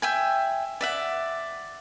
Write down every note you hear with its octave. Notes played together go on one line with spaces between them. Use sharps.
E5 G5 G#5
D5 E5 F#5